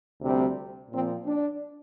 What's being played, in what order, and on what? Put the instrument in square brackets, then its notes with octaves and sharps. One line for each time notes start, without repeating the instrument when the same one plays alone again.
[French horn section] D2 C3 G3 C4
A#2 F3 C4
D4